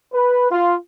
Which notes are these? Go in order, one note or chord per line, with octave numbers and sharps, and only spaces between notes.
B4
F4